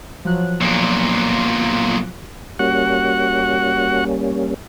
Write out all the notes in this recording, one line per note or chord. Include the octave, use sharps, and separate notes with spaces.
F3 F#3 F#6
B1 A#2
G3 A#3 C#4 F#4 F#5